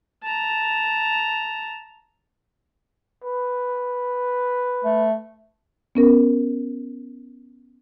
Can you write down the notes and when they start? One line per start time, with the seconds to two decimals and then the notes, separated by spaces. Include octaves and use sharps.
0.23 A5 A#5
3.24 B4
4.84 A3
5.95 B3 C#4 A#4